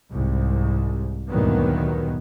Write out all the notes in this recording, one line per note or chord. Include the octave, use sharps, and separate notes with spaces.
C2 G#2
D2 G2 A#2 D#3 F#3 B3